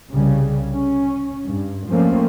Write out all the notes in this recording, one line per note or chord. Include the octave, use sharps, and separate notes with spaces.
C2 C#3 G3
C#4
G2
F3 A3 A#3 C4 C#4